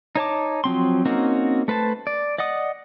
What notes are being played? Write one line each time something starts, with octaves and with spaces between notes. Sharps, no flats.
D#4 C#5 A5 D6
F3 F#3 C4 C6
A#3 C4 C#4 D#4 F#4
A3 B4 C5 A5
D5
D5 D#5 F#5 D#6